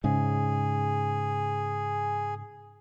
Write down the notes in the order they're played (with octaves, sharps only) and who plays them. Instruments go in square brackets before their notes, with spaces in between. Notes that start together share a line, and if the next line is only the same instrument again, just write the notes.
[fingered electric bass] G#2 C#3 [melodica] G#4